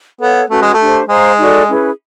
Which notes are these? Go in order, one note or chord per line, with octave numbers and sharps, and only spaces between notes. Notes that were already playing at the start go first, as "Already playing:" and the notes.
B3 A4 C#5 F5
A3 C#4 F#4 B4
G#3
A3
D4 G4 C5
G#3 C5 F5 A#5
D#4 F#4 A4 D5
C#4 E4 G#4 B4